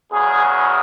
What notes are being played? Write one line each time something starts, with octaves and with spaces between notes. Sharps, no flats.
E2 C#3 F#3 G#4